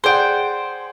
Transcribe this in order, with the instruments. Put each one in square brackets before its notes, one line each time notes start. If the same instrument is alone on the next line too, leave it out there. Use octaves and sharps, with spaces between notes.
[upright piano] G#4 D5 F#5 [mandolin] C5 G5